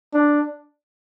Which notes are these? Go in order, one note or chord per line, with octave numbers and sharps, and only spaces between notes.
D4